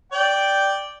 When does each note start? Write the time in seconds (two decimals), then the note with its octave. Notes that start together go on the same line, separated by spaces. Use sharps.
0.12 D5 G5